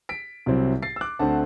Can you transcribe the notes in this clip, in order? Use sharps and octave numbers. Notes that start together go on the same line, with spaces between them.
B6 D7
C2 C3 F#3 C4 E4
A6 C7
E6
D6 F#6
D2 D3 A3 C4 F#5 A5